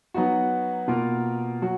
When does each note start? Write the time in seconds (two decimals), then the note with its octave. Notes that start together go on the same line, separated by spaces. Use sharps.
0.14 F#3 B3 D#4 F#4
0.88 B2 A#3 F4 A#4
1.62 F#3 F#4